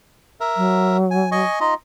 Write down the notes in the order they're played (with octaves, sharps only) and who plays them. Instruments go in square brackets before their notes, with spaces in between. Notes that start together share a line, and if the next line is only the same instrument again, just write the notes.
[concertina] A#4 E5
[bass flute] F#3
[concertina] G#5
D#5 G#5 C#6
D#4 F4 D#5